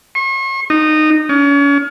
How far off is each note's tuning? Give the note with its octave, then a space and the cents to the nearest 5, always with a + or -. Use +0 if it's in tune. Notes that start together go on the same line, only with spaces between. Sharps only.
C#6 -45
D#4 -15
C#4 +35